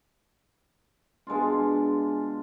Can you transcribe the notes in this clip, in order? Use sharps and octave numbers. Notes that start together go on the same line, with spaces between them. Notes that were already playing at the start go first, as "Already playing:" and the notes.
B2 G#3 D4 F4